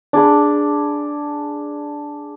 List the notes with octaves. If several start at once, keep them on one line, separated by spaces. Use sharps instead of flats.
D4 G#4 B5